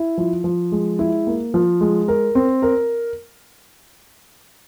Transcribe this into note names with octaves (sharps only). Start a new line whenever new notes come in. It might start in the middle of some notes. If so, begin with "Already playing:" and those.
Already playing: E4
F3
F3
G#3
E4
A#3
F3
G#3
A#4
C4
A#4